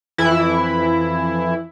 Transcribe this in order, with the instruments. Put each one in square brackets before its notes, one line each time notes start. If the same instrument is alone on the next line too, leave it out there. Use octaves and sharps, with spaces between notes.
[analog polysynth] F2 E3 E4